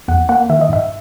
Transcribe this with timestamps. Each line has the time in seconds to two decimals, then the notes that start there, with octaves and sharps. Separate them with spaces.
0.08 E2 F#5
0.29 A#3 F#5
0.50 D#3 E5
0.61 D#5
0.69 G#2 E5